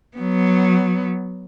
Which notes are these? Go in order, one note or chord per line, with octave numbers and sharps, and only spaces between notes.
F#3 B3